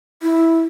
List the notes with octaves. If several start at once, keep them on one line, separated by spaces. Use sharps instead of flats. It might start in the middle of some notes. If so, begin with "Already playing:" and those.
E4